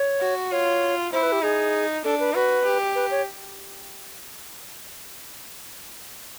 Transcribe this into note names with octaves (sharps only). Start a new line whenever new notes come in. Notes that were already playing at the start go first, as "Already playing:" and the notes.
Already playing: C#5
F#4
F4 C#5
E4 C5
B4
G4
D#4 G#4
D4 A4
B4
F#4 B4
G4
B4
C#5